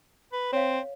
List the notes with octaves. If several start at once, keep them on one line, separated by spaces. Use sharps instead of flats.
B4
C4 C#5 F5